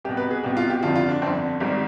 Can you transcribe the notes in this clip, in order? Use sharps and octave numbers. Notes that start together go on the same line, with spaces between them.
C2 B2 G4
B4
G#4
C2 B2 G4
F4
G4
G1 F2 D3 F4
F4
D4
G1 F2 D3 C4
G#1 G#2 D#3 G3